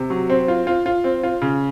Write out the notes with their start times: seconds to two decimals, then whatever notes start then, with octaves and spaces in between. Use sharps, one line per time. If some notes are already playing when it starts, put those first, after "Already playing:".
Already playing: C3
0.10 F#3
0.30 C4
0.48 F4
0.67 F4
0.86 F4
1.04 C4
1.23 F4
1.42 C#3